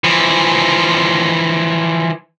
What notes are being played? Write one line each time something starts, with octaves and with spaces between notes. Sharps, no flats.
E3 F3